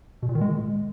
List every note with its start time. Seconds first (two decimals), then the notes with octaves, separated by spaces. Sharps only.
0.23 B2
0.29 A#2
0.35 D#3
0.41 G#3